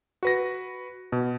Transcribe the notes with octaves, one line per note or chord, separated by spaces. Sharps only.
F#4 B4 A#6
B2